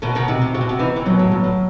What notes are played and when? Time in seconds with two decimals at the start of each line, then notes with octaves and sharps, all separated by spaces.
0.02 B2 D#3 F#4
0.15 B2 D#3
0.28 C3 D#4
0.41 C3
0.54 C3 F#4
0.61 B2
0.69 C3
0.79 E3 D#4
0.96 C3 E3
1.06 B2 D#3 F#3
1.19 A2
1.31 G2 F#3
1.44 A2